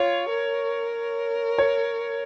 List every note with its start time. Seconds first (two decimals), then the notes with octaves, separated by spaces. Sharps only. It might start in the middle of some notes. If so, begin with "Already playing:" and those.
Already playing: F4 C#5
0.30 A#4
1.58 C#5